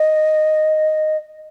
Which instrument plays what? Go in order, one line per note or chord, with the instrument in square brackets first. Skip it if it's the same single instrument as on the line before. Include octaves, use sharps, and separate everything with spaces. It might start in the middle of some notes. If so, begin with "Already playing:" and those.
Already playing: [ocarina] D#5